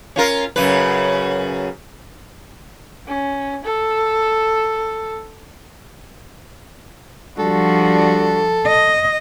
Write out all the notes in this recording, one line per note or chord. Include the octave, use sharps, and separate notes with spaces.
C#4 F4 A#4
F#2 C#3 B4
C#4
A4
F3 G3 D4 F#4 A4
D#5